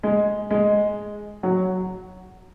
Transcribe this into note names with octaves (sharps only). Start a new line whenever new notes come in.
G#3
G#3
F#3